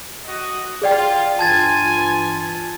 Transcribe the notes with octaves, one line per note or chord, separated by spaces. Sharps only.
F#4 D#5
F4 G#4 D5 G5
G2 E3 F4 G#5 A5 G#6 A6